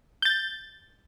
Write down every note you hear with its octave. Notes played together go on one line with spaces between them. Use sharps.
G6 A6